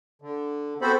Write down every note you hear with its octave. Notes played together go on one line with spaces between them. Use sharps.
D3
B3 C4 F#4 A4 C5 B5